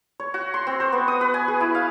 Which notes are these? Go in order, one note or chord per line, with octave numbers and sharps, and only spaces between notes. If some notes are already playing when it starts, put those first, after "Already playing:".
C#5
F#4
C6
C4
C5
B3
D#6
B4
G#5
G#4
E4
F5